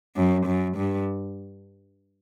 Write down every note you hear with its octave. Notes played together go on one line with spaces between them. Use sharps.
F#2
F#2
G2